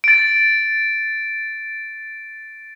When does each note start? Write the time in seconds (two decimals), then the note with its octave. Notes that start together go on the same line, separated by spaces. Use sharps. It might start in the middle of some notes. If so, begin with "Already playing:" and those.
0.04 A6 D7